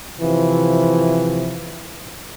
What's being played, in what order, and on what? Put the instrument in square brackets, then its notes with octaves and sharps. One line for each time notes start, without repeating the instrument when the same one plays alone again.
[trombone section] C3 E3 F3